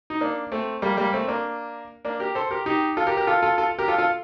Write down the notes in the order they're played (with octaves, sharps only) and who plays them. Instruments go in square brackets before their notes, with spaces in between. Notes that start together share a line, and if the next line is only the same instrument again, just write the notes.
[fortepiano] D#4
A#3 D4
A3 C4
G3 A#3
G3 A#3
A3 C4
A#3 D4
A#3 D4
G4 A#4
A4 C5
G4 A#4
D#4 G4
F4 A4
G4 A#4
G4 A#4
F4 A4
F4 A4
F4 A4
G4 A#4
F4 A4
F4 A4